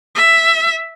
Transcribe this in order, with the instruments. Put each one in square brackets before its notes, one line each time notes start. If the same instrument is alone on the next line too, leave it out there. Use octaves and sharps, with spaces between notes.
[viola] E5